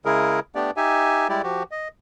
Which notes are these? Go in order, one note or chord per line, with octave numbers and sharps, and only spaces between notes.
C#3 G#3 E4 G#4 A#4
A3 B3 D4 G4 D5
D#4 G4 E5 G#5
G3 G#3 E4 G4 D5
F3 F#4 G4
D#5